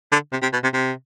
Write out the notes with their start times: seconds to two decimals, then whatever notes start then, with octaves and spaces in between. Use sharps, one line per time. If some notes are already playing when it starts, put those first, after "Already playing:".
0.12 D3
0.32 C3
0.42 C3
0.53 B2
0.63 C3
0.73 C3